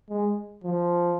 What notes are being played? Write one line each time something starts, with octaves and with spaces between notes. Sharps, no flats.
G#3
F3